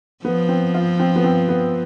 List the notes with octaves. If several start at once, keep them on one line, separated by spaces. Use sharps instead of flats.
F3 B3
C4
F4
C4
B3
C4
B3